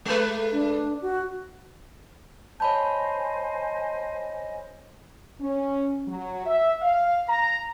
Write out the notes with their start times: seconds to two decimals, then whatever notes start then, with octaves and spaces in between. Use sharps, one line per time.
0.05 G#3 A3 B4
0.52 D4
1.02 F#4
2.60 C5 C#5 D#5 G#5 A5 B5 G6
5.40 C#4
6.07 F#3
6.46 E5
6.82 F5
7.28 A#5